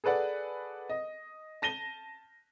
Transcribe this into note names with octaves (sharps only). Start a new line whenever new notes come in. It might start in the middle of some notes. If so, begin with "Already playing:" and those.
G#4 A4 B4 D5 F#5
D#5
A5 A#6 D#7 G7